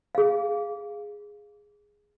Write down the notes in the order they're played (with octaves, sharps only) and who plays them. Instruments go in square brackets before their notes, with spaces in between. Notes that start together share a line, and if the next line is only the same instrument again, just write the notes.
[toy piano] G#4 F5